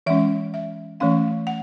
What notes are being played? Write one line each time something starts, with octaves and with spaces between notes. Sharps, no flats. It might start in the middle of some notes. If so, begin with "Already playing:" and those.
E3 G#3 C#4 E5
E5
E3 A3 C#4 F5
F#5